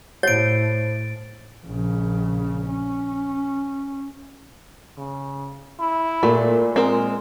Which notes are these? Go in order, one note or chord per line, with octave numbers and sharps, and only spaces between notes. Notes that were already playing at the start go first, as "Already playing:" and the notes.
A2 C5 C#5 A6 D7
A#1 C#3
C#4
C#3
E4
A#2 A3
G#3 C4 A#4